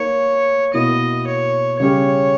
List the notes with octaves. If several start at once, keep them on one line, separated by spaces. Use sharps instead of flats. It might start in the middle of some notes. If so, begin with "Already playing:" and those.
Already playing: A#3 D#4 A#4 C#5
B2 A#3 E4 D#5
C#5
C#3 G3 C#4 G4 C#5